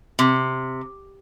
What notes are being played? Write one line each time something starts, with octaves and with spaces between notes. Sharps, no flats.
C3